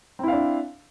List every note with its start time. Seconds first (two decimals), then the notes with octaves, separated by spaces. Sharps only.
0.19 C4
0.23 E4
0.28 F5
0.32 D4